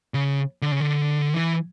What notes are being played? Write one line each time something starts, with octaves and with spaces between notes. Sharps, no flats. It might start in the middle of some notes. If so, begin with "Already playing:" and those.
C#3
D3
C#3
D3
E3